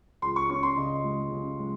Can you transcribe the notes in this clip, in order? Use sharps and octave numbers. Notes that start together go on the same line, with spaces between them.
C#2 C6
C#6
C#4 C#6
C6
C#3 D#5
G#3
C#3
G#3